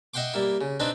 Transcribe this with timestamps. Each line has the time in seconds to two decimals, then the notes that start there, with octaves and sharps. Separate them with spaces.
0.14 D#5 E5 F#5 G5 C6 D6
0.34 G3 A#3 E4
0.61 C#3
0.80 C4 D4 D#4 B4